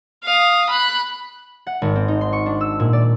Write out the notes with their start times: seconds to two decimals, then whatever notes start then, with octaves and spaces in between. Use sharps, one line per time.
0.24 F5 D#6
0.70 B5 F#6
1.67 F#5
1.82 G#1
1.95 C4
2.08 D#4
2.21 C6
2.33 C#6
2.46 D4
2.61 E6
2.80 A#2
2.93 D5